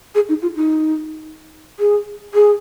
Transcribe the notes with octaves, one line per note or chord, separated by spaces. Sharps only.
G#4
D#4
F4
D#4
G#4
G#4